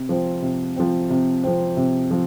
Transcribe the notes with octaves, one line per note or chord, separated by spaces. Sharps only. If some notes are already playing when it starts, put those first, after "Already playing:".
Already playing: C3
F3 C4
C3
F3 C4
C3
F3 C4
C3
F3